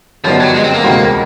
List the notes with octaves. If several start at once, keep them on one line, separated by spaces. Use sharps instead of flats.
G1 F#2 D#3 F3 G3 B3
F#3
G#3
C4
A#3
E1 D2 C3 D#3 G#3